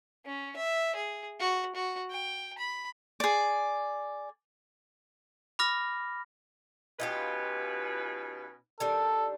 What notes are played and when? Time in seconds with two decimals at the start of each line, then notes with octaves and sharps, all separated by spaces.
0.25 C#4
0.56 E5
0.96 G#4
1.40 F#4
1.75 F#4
2.11 G5
2.59 B5
3.20 G#4 D5
5.59 B5 D6 F6 A#6
7.00 B2 C#4 D#4 F4 G4 B4
8.80 D#3 G3 D4 A4